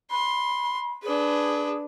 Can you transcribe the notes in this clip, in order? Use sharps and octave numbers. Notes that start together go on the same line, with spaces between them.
B5 C6
D4 G#4 B4